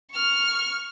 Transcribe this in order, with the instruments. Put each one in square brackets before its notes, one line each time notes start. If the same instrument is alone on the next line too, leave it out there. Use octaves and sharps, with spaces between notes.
[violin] C#6 F6